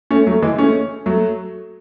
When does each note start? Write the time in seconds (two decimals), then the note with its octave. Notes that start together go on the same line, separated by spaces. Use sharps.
0.11 A3 C#4
0.26 F#3 A3
0.42 E3 G#3
0.58 A3 C#4
1.06 F#3 A3